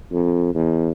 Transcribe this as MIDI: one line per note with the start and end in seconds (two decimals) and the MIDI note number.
0.12 0.52 41
0.54 0.91 40